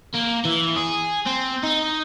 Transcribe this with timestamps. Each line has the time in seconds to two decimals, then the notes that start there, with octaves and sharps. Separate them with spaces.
0.14 A#3
0.45 E3
0.76 G#4
1.26 C4
1.63 D#4